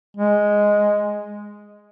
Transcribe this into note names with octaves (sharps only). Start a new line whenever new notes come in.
G#3